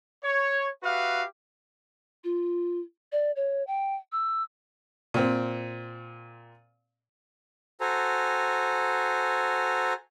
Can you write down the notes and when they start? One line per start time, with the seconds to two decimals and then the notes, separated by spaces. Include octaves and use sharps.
0.24 C#5
0.84 F#4 G4 B4 E5 F5
2.24 F4
3.12 D5
3.36 C#5
3.67 G5
4.12 E6
5.14 A#2 C4
7.81 F#4 A4 C5 G#5 A#5